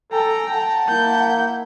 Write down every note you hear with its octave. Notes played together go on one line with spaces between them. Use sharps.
A4 G5 G#5 A#5
F#5 A5
A#3 E4 G6